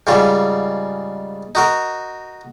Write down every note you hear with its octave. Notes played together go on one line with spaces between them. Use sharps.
G#2 C#3 G3 F4
D#4 F#4 A#4